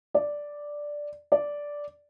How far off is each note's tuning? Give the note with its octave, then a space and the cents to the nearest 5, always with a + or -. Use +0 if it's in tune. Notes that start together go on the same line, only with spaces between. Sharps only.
D5 +0
D5 -5